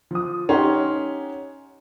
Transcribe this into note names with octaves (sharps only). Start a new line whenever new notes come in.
F3 D#6
C#4 D#4 G4 F#5 C6